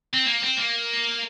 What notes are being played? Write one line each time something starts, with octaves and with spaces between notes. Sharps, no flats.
C4
A#3
C4
A#3